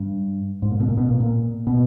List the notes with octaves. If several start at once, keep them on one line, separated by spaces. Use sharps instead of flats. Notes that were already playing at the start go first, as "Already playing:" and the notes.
Already playing: G2
G#2
A#2
B2
A#2
B2
A#2
A#2
B2